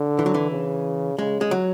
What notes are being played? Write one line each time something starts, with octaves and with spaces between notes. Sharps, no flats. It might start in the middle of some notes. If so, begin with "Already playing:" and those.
Already playing: D3
E3
F#3
E3
C#3
C#3 G#3
G#3
F#3